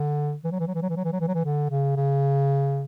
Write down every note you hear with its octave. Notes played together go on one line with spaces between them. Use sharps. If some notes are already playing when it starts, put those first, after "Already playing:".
Already playing: D3
E3
F#3
E3
F#3
E3
F#3
E3
F#3
E3
F#3
E3
F#3
E3
D3
C#3
C#3